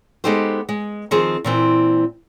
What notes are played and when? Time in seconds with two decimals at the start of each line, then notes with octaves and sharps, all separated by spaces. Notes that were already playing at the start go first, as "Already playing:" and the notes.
0.24 G#3 B3 D#4 G4 A4 C5
0.69 G#3
1.11 D#3 F3 C4 G#4
1.44 A#2 E3 C4